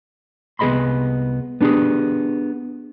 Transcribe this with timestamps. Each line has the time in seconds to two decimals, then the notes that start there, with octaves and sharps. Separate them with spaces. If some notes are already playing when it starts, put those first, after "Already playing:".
0.59 C2 B3 G#4 D#5 B5 C6
1.61 B3 D4 D#4 G4 G#4